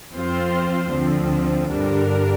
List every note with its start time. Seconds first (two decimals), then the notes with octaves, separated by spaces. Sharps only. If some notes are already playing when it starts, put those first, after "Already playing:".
0.12 F2 F3 C4 F4 C5
0.92 D2 D3 F3 C4
1.71 G2 D3 G3 D4 A#4